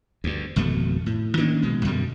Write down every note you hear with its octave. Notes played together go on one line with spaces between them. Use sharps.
D2 G2
G#1 F2 B2 A3
A2
D#3 A#3 C#4 D4
A#1 B2 G#3
F#2 B2 D3 G3